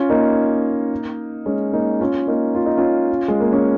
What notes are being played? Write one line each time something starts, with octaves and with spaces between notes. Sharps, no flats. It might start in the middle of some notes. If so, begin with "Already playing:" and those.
Already playing: C#4 F4
A#3 D#4
G#3 C#4
A#3 D#4
C#4 F4
A#3 D#4
F4
D#4
C#4 F4
G#3
A#3
C#4